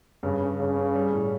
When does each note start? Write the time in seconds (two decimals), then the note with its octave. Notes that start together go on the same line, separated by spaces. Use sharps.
0.23 G2 C#3
0.41 C#4
0.59 G2 C#3
0.77 C#4
0.95 G3
1.12 A2